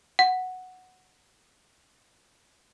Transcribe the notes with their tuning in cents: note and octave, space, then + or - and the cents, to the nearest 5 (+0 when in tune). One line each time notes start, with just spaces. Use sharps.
F#5 +0